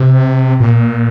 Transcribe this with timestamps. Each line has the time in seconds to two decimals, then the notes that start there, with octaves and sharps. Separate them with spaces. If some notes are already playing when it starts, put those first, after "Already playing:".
Already playing: C3
0.60 A#2